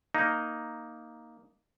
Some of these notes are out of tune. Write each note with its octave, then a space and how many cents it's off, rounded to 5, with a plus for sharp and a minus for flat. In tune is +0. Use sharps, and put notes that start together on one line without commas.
A#3 +0 D#4 +0